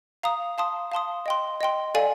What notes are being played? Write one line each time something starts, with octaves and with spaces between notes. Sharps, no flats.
F5 A#5 D#6
F5 A5 C6 D#6
F5 A5 C6 D#6
D#5 G5 C6
D#5 G5 C6
A4 D5 F5 G#5